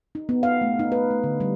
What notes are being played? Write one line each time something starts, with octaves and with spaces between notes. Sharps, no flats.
D#4
B3
F5
A3
D#4
B4
A3
D3
G3